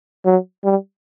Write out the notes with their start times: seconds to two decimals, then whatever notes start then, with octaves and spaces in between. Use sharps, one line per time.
0.25 F#3
0.64 G3